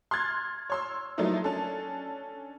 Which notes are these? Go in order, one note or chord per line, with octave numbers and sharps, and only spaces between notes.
C6 F6 F#6 G#6 A6
C#5 C6 E6
F3 F#3 A3 A#3 D#4 E4
C#4 D4 A4